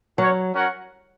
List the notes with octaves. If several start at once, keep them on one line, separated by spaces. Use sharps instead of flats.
F#3 C#4 F#4 C#5
C#4 F#4 A#4 C#5 F#5